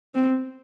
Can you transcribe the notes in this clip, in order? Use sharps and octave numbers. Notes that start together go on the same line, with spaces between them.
C4